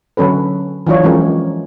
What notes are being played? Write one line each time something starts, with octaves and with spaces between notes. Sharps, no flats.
D3 F#3 C#4 A4 B4
E3 F#3 D4 F4 C#5
E3 F3 G#3 C#4 G4 A#4